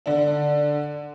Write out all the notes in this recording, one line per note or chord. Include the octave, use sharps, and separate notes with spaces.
D3 D4